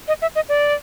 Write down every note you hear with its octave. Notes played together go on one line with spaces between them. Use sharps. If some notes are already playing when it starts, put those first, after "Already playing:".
D#5
E5
D#5
D5